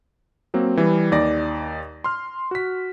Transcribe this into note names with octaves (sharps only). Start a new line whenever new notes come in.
F#3 A#3 C4
E3 G3
D#2 D#4 D5 A#6
C6 F6
F#4 B6